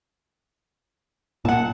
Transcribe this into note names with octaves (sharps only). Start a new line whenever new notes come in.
A#2 F#5 A5